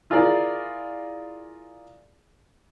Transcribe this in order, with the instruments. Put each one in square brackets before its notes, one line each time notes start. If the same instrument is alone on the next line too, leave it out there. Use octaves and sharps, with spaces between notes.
[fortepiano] E4 F4 G#4 A#4 D5